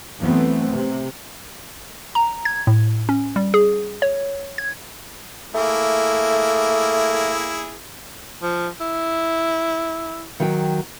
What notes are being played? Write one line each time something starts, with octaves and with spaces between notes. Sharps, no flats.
E3 F#3 A3 B3 C4
C3
A#5
G#6
A2
C#4
G3
G#4
C#5
G#6
A3 A#3 E4 G#4
F3
E4
D#3 F#3 G5